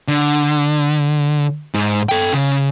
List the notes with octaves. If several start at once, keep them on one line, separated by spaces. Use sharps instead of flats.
D3
G#2
A4 G5
C#3